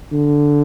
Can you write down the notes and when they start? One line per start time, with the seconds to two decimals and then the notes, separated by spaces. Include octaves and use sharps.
0.12 D3